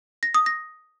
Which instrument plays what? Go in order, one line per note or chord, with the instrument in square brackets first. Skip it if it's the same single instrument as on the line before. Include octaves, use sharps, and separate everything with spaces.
[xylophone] A#6
D#6
A#6